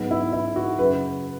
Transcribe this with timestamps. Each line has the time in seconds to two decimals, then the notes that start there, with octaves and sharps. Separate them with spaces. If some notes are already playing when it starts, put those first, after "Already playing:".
Already playing: G#2 F#3 B3
0.11 E4
0.33 E4
0.56 F#4
0.79 F#2 C#3 F#3 B4